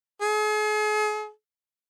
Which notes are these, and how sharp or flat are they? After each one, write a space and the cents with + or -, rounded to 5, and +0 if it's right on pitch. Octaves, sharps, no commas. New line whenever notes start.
G#4 +40